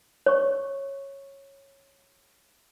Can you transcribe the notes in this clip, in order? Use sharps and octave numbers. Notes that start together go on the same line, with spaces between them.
C#5 C#6